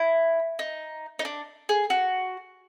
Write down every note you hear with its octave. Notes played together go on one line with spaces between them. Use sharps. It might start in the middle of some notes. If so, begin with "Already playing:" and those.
Already playing: E4
D#4
D#4
D4
G#4
F#4